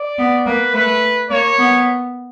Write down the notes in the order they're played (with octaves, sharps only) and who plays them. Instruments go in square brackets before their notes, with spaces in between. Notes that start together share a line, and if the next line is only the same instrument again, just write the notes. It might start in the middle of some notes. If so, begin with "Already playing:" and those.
Already playing: [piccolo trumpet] D5
[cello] B3
[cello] A#3 [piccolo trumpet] B4
[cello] A3 [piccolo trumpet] B4
[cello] A#3 [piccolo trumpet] C#5
[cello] B3